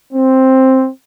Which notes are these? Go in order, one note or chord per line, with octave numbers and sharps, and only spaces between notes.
C4